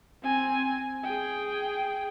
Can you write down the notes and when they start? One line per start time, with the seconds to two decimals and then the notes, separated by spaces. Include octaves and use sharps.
0.23 C4 G#5
1.04 G#4 G5